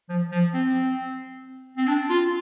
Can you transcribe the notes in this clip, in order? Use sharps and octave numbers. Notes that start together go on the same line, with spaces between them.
F3
F3
C4
C4
D4
F4